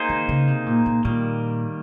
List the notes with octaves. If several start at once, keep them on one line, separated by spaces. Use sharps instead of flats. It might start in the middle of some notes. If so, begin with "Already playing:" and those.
Already playing: A#3 D#4 G#4 C5
D#3
C#3
C3
A#2
A#2
A#2 D#3 G3 A#3